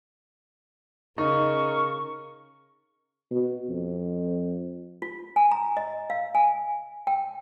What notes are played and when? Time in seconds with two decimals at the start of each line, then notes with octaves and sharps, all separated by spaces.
1.18 C#3 D#4 A#4 C#6
3.31 B2
3.70 F2
5.02 F4
5.36 G#5
5.52 A#5
5.77 D#5
6.10 F5
6.35 G#5
7.07 G5